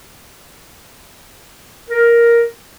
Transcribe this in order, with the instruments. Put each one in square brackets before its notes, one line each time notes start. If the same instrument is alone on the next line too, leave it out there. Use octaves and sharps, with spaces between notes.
[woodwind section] A#4